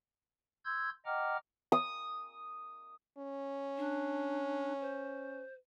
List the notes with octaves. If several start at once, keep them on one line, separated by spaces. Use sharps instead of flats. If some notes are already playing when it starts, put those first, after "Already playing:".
C6 E6 G6 G#6
D#5 F#5 G5 A#5 D6 F6
D#6
C#4
D4
C5